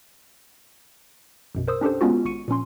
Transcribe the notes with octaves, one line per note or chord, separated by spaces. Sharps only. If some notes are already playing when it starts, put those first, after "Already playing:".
A#1 F#2 B2
A#4 C5 D#6 E6
C#4 D4 G4 A4 C5
G#3 B3 C#4 F4 F#4
G#1 C#6 C#7 D#7
A#2 F3 C#4 C6